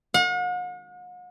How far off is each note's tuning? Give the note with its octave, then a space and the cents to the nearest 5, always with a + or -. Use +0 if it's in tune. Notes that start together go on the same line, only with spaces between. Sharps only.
F#5 -45